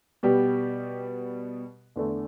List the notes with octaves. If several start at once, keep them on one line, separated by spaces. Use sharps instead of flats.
B2 G3 B3 G4
E2 D3 A3